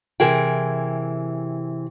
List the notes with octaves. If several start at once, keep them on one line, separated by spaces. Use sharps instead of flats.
C3 E3 G#4 A#4 G5